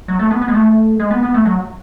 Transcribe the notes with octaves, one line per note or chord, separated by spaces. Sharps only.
F#3
A3
B3
B3
G#3
A3
G#3
B3
B3
A3
F#3